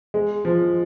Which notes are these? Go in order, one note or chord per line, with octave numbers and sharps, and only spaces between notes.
G#3
F3